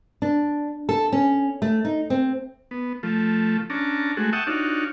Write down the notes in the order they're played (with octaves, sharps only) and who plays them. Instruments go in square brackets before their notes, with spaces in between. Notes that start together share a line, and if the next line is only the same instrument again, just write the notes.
[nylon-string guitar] D4
A4
C#4
A3
D#4
C4
[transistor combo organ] B3
F3 A3
C#4 D4 A5 A#5
G#3 A3 F#4
E5 F#5 G5 A5 C#6 D#6
D4 D#4 F4 F#4 C#5